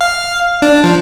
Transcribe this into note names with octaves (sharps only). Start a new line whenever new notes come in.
F5
D4
F3